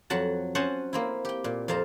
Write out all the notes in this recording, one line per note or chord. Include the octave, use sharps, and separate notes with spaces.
F2 F#3 F#5 A5
C#4 C5 D#5 F#5 G#5 A5
A#3 C4 E4
G4 G5
A#2
F2 C4 F5 A5 A#5